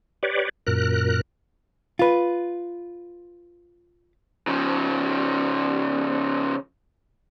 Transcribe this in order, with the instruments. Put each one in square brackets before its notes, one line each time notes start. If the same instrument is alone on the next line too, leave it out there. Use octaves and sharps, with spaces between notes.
[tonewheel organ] G4 B4 C#5 D5
F#2 A#2 A#4 F#6
[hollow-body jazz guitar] F4 B4
[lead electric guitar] C#3 F3